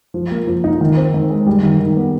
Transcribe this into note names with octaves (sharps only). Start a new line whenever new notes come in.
F3
A#3
F3
D#4
D#3
C4
D#3
G#3
G3
D#3
D#3
B3